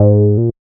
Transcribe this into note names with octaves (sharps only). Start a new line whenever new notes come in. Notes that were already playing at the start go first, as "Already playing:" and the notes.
Already playing: G#2
A#2